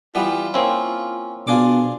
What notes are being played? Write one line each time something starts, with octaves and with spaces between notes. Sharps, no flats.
E3 G3 B3 F4
A#3 C4 C#4 E4
B2 D4 F4 G#4 D6